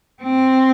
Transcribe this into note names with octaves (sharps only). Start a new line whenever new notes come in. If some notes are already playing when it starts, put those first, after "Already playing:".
C4